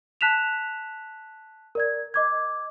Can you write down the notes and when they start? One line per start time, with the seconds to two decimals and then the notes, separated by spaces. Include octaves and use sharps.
0.21 A5 F#6 B6 E7 F7
1.75 A#4 D5 G#6
2.14 D#5 D6 G#6